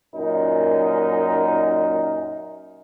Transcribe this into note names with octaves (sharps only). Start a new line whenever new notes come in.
F#2 A#2 D#4 A#4